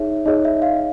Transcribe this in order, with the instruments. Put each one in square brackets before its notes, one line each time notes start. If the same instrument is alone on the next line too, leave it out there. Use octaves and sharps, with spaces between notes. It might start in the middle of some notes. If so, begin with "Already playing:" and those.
Already playing: [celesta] D#4 G#4 C#5 E5
D#4 G#4 C#5 D#5
E5
F5